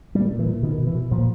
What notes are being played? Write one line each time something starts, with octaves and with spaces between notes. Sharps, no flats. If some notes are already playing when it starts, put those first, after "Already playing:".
A#2 G3
A#2
E3
A#2
B2 D#3
B2
E3
B2
A#2 F3